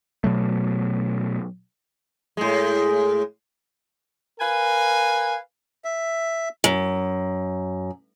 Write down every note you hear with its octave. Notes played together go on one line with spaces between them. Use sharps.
B2 F#3 A3
A2 G#3
A#4 B4 F5 G#5
E5
F#2